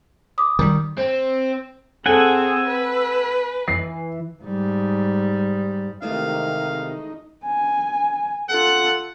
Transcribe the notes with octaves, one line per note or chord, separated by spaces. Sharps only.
D6 D#6
D#3 G3
C4
C4 G#4 A4 F#5 G#5 E6
B4
E3 C7
G#2 G3
C3 D#3 E3 G#3 A3 D#4 F5
G#5
F4 A4 F#5